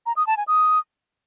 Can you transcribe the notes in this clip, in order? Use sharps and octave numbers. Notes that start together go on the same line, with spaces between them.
A#5
D#6
A5
G#5
D#6